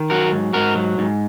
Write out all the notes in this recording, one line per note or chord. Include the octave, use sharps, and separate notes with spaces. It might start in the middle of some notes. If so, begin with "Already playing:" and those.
Already playing: D#3
F#3 F#4 A#4
G#2
G#2 F#4 A#4
F#3
G#2